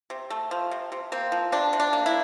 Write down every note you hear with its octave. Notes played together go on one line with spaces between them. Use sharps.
C3
A3
F3
C3
C3
A#3 C4
F3
C3 D4
C3
D4
A#3
E4